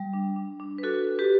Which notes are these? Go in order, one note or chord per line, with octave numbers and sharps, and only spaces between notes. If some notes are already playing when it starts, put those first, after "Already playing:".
Already playing: G3
D4
D4
D4
B4
F#4 A4
F#4
G4 B4